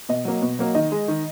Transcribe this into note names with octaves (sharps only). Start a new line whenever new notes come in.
B2 D#5
F#3 A#3
B2
F#3 A#3
D#3 D#5
G#3
D#3